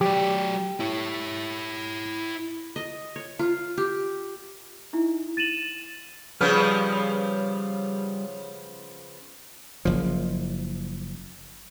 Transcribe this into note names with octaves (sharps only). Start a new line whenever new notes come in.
F#3 G4 D5
E4 C#5
D#5
C#5
F4
G4
D#4 E4
A6 D#7 E7 F#7
C#3 F3 G3 B3 F6
F#1 F3